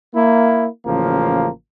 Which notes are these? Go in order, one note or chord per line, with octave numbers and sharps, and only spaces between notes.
A#3 E4
A1 C#3 F3 A#3